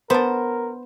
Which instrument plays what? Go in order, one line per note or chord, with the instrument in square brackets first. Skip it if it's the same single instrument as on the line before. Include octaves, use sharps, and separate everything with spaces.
[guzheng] B3 [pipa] D4 C5 [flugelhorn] A#4